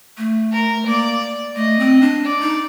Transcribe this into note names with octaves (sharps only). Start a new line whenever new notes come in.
A3
A#4
A#3 D5
A3 D#5
C4
D4
D5
D#4